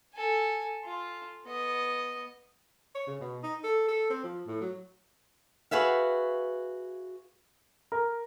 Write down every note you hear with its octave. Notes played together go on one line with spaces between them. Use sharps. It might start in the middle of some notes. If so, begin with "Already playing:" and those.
A4 G#5
F4
B3 D#5
C#5
C#3
B2
D#4
A4
A4
C4
F3
A2
F#3
F#4 G#4 B4 E5 F5
A#4